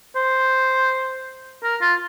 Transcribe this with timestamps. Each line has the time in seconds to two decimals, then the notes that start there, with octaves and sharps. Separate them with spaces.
0.16 C5
1.63 A#4
1.81 F4